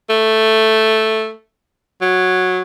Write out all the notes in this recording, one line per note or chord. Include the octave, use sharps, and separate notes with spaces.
A3
F#3